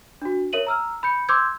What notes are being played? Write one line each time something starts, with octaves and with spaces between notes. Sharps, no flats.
D4 F#4
A#4 C#5 E5 D#7 F#7
A#5 E6 F6
B5 G6 C#7
C6 D6 E6 G6 G#6